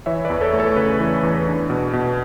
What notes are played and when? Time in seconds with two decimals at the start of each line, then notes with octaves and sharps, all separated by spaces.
0.06 E3 C#5 E5
0.25 B4 D5
0.30 E2
0.41 A4 C#5
0.53 A3
0.59 A4 C#5
0.76 C#3 B4
1.00 E3
1.23 E2
1.47 D4
1.70 B2
1.93 B2